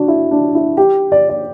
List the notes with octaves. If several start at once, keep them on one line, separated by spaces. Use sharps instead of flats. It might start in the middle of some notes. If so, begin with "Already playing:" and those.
Already playing: D4 F#4
E4
D4
E4
G4
D5
D5